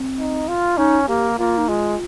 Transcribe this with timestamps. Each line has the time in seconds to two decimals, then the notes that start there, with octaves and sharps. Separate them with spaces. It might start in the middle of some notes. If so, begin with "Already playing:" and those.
Already playing: C4
0.19 D#4
0.48 F4
0.78 C#4 D#4
1.08 A#3 G4
1.39 A#3 F4
1.58 D#4
1.68 G#3 F4